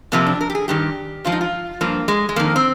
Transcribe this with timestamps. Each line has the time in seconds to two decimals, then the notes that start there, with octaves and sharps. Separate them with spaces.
0.12 F2 C3 F3 A#3
0.26 D4
0.41 A#4
0.50 G4
0.55 G#4
0.68 G2 D#3 G4
1.25 G#2 F3 F4
1.32 D#4
1.41 F4
1.81 G2 F3 A#3
2.08 G#3
2.29 G#3
2.36 F2 D#3 A#3
2.56 C4